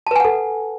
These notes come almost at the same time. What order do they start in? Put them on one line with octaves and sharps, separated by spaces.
A5 B4 G#5 F#5 A4